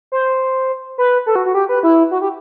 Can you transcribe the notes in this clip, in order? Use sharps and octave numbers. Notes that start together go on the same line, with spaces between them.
C5
B4
A4
F#4
F#4
G4
B4
E4
F#4
G4